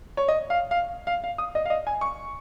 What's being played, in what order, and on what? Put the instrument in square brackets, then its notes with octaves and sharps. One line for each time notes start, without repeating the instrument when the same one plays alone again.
[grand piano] C#5
D#5
F5
F5
F5
F5
D#6
D#5
F5
D#5
G#5
C#6